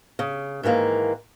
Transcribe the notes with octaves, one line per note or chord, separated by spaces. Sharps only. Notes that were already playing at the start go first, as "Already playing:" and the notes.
C#3
G#2 D#3 E3 A#3